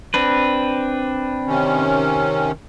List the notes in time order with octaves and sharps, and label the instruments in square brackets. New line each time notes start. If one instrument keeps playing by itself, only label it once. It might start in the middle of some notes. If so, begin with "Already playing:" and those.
[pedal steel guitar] C4 D4 B4
[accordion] C3 D#3 C#4